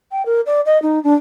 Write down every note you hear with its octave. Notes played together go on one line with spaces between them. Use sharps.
G5
A#4
D5
D#5
D#4
D4